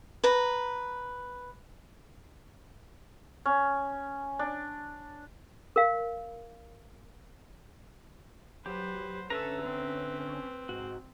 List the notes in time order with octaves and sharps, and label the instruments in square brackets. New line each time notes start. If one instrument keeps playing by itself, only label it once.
[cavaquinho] B4 A#5
[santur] C#4
D4
[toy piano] A#4 F5
[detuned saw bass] F#3 [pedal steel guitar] G4 [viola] B4 C5
[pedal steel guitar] D3 E5 A#5 [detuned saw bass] C#4 [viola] A4 [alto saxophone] B4
[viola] C4
[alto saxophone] B4
[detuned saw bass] G#2 [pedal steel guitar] F#4